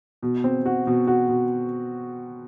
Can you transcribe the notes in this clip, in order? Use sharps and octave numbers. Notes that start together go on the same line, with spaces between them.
B2
C4
F#4
B2
F#4
B2